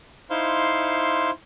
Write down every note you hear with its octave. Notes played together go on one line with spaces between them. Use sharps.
D#4 E4 C5 F5 C6